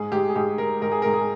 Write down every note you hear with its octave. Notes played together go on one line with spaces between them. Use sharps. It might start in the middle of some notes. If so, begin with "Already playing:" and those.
Already playing: G#2 G#4
G#2 G4
G#4
G#2 G4
G#2 A#4
G#2 A#4
G#4
G#2 A#4
G#4